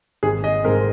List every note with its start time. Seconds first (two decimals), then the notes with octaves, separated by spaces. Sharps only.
0.23 G#1 G#4
0.44 D#5
0.64 G#2 G#3 C4 A#4